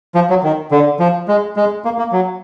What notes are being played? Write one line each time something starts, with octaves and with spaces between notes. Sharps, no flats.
F3
F#3
D#3
D3
F3
G#3
G#3
A#3
A#3
F#3